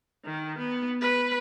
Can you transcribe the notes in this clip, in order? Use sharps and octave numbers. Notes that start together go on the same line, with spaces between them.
D#3
B3
B4